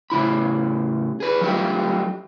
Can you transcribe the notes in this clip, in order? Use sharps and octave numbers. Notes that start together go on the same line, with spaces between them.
A2 C#3 E4 B5
G#4 B4
F#3 G3 A3 D#4 F4 G4